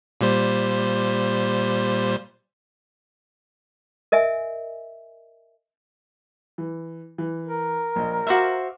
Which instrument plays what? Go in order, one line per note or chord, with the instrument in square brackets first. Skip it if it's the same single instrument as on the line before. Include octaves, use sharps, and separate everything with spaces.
[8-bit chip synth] A#2 G3 C5
[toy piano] A#4 D#5 E5 G#5
[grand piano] E3
E3
[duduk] A#4
[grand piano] A#1 D#5
[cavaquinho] F#4 C5 E5 [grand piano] F5 D6 F6